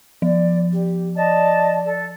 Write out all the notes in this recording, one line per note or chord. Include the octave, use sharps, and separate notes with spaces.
F3 D5
G4
D5 D#5 A5
A4